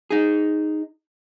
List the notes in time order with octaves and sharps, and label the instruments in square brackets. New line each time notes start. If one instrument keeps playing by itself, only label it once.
[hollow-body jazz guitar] D#4 G#4